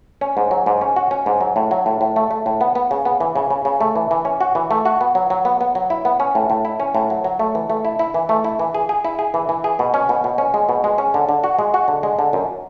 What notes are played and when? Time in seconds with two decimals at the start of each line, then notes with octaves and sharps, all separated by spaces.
0.21 C#4
0.37 G#2
0.51 F#3
0.66 G#2
0.81 C#4
0.96 F#4
1.11 C#4
1.26 G#2
1.41 F#3
1.56 A2
1.71 F#3
1.86 A2
2.01 A2
2.16 A3
2.31 A3
2.46 A2
2.61 B3
2.75 B3
2.91 C#3
3.05 B3
3.20 E3
3.36 C#3
3.50 C#3
3.65 C#3
3.81 A3
3.96 E3
4.11 E3
4.25 C#4
4.41 F#4
4.55 E3
4.71 A3
4.85 F#4
5.01 B3
5.15 F#3
5.30 F#3
5.45 B3
5.61 B3
5.75 F#3
5.90 E4
6.05 B3
6.20 C#4
6.35 A2
6.50 A2
6.65 E4
6.80 C#4
6.95 A2
7.10 F#3
7.24 F#3
7.39 A3
7.55 E3
7.70 A3
7.85 E4
7.99 E4
8.14 E3
8.29 A3
8.44 E4
8.59 E3
8.75 G#4
8.89 G#4
9.05 E4
9.19 G#4
9.34 E3
9.49 E3
9.64 G#4
9.79 B2
9.94 C#4
10.09 B2
10.24 B2
10.38 C#4
10.54 G#3
10.69 B2
10.84 G#3
10.98 C#4
11.14 D3
11.29 D3
11.44 F#4
11.59 G#3
11.74 F#4
11.88 D3
12.03 G#3
12.19 D3
12.33 F#2